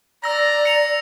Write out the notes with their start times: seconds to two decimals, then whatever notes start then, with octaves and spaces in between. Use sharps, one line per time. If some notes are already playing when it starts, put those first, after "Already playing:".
0.24 D5 A#5 E6 A#6
0.65 C#7 F7